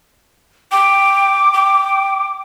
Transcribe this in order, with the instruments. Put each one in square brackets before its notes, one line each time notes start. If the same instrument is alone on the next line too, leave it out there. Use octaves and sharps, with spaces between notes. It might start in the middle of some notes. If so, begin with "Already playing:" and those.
[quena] G5 [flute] D6
[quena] G5